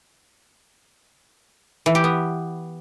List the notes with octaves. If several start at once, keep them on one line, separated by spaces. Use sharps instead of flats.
E3
G4
B3